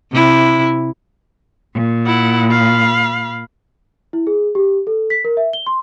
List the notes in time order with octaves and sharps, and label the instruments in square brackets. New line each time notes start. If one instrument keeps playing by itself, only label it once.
[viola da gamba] C3 E4
[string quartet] A#2
[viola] E4 F#5
F5 B5
[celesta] E4
G#4
G4
A4
B6
A#4
E5
G7
C6